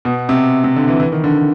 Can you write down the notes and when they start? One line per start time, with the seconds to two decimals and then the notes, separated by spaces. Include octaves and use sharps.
0.05 B2
0.29 C3
0.64 C3
0.76 D3
0.88 E3
1.00 E3
1.12 D#3
1.24 D3